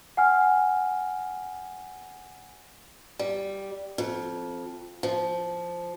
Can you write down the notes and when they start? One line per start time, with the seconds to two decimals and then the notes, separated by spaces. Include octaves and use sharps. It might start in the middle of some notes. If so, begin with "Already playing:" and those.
0.17 F#5 G#5 F6
3.19 G3
3.98 F2
5.03 F3